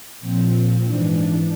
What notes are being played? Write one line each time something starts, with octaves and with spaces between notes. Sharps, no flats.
A#2 F3 C4
G#2 E3 D4